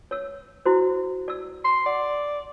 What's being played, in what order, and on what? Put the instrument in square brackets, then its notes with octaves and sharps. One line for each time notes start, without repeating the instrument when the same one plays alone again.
[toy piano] C#5 E6
E4 F#4 C5
D5 E6
[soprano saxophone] C6
[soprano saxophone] D5 [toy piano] F#5